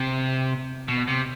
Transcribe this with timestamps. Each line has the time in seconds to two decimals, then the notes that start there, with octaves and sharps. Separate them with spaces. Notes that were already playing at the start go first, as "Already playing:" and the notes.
Already playing: C3
0.88 B2
1.08 C3